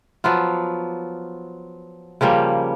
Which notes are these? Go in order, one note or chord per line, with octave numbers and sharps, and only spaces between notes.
F3 F#3 B3 F4
C#3 F3 G3 A#3